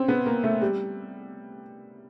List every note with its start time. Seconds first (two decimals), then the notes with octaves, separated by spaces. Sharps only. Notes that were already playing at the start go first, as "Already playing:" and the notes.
Already playing: C4 C#4
0.08 B3
0.26 A#3
0.44 A3
0.62 G3